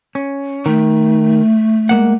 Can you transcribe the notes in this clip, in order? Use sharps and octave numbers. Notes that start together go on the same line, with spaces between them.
C#4
D#3 A3
G#3 A#3 F#5